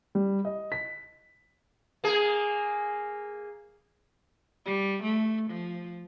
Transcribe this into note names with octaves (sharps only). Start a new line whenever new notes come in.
G3
D#5
B6
A#3 G#4
G3
A3
F3